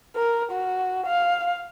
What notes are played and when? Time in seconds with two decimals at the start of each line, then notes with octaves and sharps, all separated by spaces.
0.15 A#4
0.52 F#4
1.06 F5